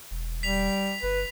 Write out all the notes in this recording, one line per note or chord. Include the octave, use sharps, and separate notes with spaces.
E1
G3 B6 F7
G1 B4